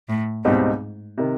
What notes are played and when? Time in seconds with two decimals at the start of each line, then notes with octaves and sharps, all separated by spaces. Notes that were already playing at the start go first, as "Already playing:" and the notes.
0.09 A2
0.44 C#2 G#2 B2 G3 C4 D#4
1.18 C3 D#3